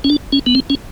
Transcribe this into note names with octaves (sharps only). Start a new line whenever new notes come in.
C#4
D4
C#4
B3
C4
C#4